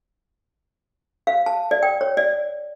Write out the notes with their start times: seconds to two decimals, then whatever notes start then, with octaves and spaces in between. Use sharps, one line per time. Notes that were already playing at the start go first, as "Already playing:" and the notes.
1.27 F5
1.46 A5
1.71 D5
1.83 G5
2.01 C#5
2.17 D5